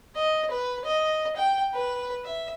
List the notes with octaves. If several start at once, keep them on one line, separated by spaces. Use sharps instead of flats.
D#5
B4
D#5
G5
B4
E5